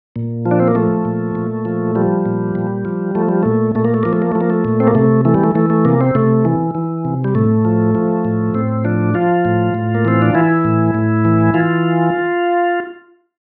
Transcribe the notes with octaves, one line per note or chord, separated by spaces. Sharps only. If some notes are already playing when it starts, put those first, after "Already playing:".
A#2
F3
D4
C4
A#3
F3 A3
A#2
A#2
F3
F3 G3
A#2
A#2
F3
F3 A3
G3
A#2 A3
A#2 A3
A#3
A3
F3 A#3
A3
A#3
F3 A3
A#3
A3
A#2
C4
A#3
C3 A3
E3 A3
G3
A3
E3 A3
A3
C3 A#3
C4
C3 A3
E3
E3
C3
G3
A2 A3
F3
F3
A2
A2 C4
F3 D4
F3 F4
A2
A2
A#3
E3 C4
D4
E3 E4
A2
A2
E3
E3 F4